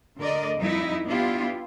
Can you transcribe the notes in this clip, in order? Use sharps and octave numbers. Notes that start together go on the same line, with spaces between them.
D2 D3 A#4 D5 D#5
F2 G3 D#4 E4
B3 D4 E4 F4 G4